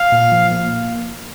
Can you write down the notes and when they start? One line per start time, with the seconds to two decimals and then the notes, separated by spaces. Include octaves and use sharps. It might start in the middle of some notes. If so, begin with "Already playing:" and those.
Already playing: F5
0.12 A#2
0.32 F3
0.51 A#3